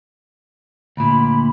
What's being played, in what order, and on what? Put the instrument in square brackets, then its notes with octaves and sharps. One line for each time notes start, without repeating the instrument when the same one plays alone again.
[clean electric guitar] D2 A#2 [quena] B5